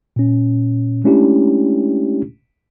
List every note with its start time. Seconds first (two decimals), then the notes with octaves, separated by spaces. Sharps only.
0.16 A#2 C#4
1.04 G#3 A3 C#4 D4 E4 G4